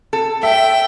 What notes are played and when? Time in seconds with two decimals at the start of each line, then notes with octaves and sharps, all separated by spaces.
0.13 A4
0.43 E5 G5